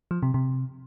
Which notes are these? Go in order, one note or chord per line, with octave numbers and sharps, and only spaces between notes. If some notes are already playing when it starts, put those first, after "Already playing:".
F3
C3
C3